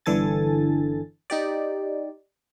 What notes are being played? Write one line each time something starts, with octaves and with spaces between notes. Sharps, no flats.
G1 D3 E3 A4 G#5 A6
D#4 G4 D5